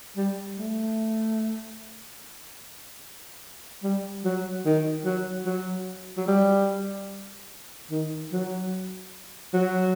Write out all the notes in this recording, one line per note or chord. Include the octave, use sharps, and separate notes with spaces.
G3
A3
G3
F#3
D#3
F#3
F#3
F#3
G3
D#3
F#3
F#3